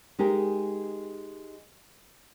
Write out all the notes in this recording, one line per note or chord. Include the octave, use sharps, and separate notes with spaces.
G#3 D#4 G4 G#4 A#4